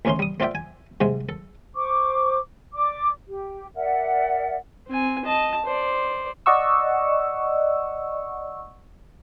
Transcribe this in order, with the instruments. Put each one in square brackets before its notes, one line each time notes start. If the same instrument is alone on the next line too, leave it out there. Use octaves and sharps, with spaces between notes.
[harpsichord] A1 D2 A2 C#4 D#4 C6
G3 D#6
A3 C4 F4 D5 E5 G5
G#5
G#2 C3 G#3
A4
[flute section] C5 C#6 D6
D5 D6
G4
A#4 D5 E5 F#5
[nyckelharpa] C4 G#5
D#5 A5
C5 D5
[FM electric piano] D5 D#5 F#5 C#6 E6